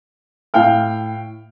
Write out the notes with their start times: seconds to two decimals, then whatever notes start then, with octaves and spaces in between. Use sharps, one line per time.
0.54 A2 F5 G5 F6